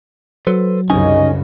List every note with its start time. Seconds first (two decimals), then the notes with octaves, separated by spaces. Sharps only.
0.47 F#3 A4 B4 C5
0.90 C2 F#2 C#3 C#4 D#4 D#5 G#5